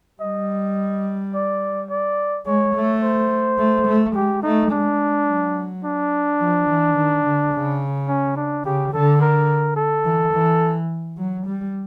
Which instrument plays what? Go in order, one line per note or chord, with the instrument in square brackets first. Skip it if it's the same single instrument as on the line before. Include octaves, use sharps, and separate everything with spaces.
[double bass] G3 [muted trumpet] D#5
[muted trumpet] D5
D5
[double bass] G#3 [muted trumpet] C#5
[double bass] A3
[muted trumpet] C5
[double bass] A3
A3
[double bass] G#3 [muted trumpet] G4
[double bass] A3 [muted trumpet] D#4
[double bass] G#3 [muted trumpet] D4
[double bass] F#3
[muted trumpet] D4
[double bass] F3
E3
D#3
D3
C#3
[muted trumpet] C#4
D4
[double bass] C#3 [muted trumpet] G4
[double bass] D3 [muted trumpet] A4
[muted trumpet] A#4
A4
[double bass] E3
E3
F#3
G3